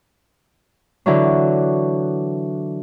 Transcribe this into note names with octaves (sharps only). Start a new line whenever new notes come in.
D3 E3 F#3